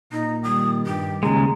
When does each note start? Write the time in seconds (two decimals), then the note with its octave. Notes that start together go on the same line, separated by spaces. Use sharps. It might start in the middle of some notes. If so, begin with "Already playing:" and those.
0.12 A#2 D#4
0.43 D#3 G3 D#6
0.86 G2 G4
1.23 D#2 C#3 G#3 A#5